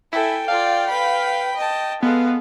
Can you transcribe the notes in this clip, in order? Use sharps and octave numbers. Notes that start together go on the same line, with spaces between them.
E4 A4 G5 G#5
F4 D5 F5
B4 B5
D#5 A5
G#3 B3 A4 F5